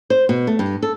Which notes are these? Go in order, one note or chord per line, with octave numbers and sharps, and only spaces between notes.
C5
B2
A3
G2
A4